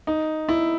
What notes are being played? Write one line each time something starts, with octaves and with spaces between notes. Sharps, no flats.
D#4
E4